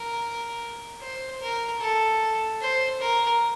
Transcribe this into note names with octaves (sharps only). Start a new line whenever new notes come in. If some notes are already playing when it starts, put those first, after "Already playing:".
Already playing: A#4
C5
A#4
A4
C5
A#4